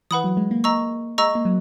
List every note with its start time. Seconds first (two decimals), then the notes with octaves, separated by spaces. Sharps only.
0.11 E3 B4 F#5 B5 D#6
0.24 F#3
0.37 G#3
0.51 A#3
0.64 D#5 A#5 C#6 E6
1.18 G#3 D#5 A#5 C#6 E6
1.35 A#3
1.45 F#3